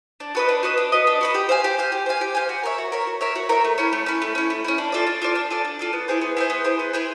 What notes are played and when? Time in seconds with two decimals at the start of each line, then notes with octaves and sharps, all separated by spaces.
0.20 D4
0.35 F#4 B4 D#5
0.49 D4
0.63 F#4 B4 D#5
0.78 D4
0.92 F#4 B4 D#5
1.07 D4
1.21 F#4 B4 D#5
1.34 G4
1.49 C5 F5 G#5
1.64 G4
1.78 C5 F5 G#5
1.92 G4
2.06 C5 F5 G#5
2.21 G4
2.35 C5 F5 G#5
2.49 F#4
2.63 A#4 C#5 E5
2.78 F#4
2.92 A#4 C#5 E5
3.07 F#4
3.21 A#4 C#5 E5
3.35 F#4
3.49 A#4 C#5 E5
3.64 A3
3.78 C#4 E4
3.93 A3
4.06 C#4 E4
4.22 A3
4.35 C#4 E4
4.50 A3
4.64 C#4 E4
4.78 D4
4.92 F4 A4 D5
5.07 D4
5.22 F4 A4 D5
5.35 D4
5.50 F4 A4 D5
5.65 D4
5.79 F4 A4 D5
5.93 B3
6.08 E4 G#4 C5
6.21 B3
6.37 E4 G#4 C5
6.50 B3
6.64 E4 G#4 C5
6.79 B3
6.93 E4 G#4 C5